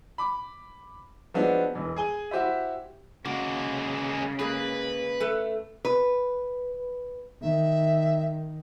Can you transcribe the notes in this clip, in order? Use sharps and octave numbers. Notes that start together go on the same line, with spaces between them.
B5 D6
F3 G#3 B3 C4 D4 F#4
E1 E3
G#4 G#5 G7
E4 F#4 G4 C5 E5
C#3 G#3 A#3 F#4
G#3 A#3 G#4 B4
A3 A4 B4
B4
D#3 E5